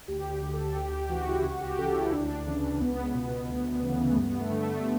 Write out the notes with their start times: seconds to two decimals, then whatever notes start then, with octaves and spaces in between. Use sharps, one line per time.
0.08 D2 G4
0.42 D3
0.53 A4
0.76 D2 G4
0.93 G4
1.09 C#3 E3 F#4
1.27 E4
1.44 C#2
1.50 F#4
1.61 G4
1.78 C#3 E3 A4
1.95 E4
2.12 D2 D4
2.47 C#3 E3
2.80 C#2 B3
3.14 B2
3.48 D2
3.82 C#3 E3
4.12 A3
4.16 G2 B3
4.39 A3
4.51 D3
4.62 A3